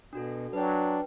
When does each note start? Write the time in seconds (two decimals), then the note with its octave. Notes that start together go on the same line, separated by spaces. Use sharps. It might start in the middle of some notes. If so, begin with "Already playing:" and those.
0.13 B2 D4 F#4 A4
0.53 F#3 D4 B4 G5